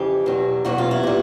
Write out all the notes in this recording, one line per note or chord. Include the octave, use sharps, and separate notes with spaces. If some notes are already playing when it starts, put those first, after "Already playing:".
Already playing: F2 C#3 E3 G4
E2 B2 F#3
E2 B2 F#3 F#4
F4
E4
A#2 G3